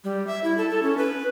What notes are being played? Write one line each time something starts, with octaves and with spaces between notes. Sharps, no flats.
G3
E5
E4
A4
A4
C#4
B4